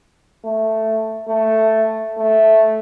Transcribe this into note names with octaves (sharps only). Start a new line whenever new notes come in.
A3
A3
A3